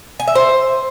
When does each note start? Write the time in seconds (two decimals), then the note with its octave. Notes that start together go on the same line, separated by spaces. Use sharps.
0.20 G#5
0.28 E5
0.35 C5